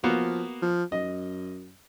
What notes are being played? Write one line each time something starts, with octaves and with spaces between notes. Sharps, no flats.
F3 A#3 B3 F#4
F3
F#2 D#5